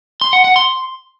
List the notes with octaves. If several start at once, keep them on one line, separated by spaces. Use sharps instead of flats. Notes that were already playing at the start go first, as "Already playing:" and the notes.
C6
F#5
F#5
C6